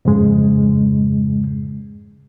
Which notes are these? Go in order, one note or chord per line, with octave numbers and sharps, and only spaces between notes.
F2 G#2 C#3 G#3